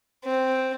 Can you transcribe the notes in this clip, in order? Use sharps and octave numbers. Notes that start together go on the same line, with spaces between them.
C4